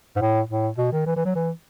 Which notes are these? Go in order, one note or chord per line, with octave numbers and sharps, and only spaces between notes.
G#2
A2
A2
B2
D#3
E3
E3
F#3
E3